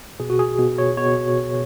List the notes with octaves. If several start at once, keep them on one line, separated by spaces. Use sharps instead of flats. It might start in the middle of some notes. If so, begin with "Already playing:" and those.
B2 G#4
F#4
G#4
B2
C#5
B2 C#5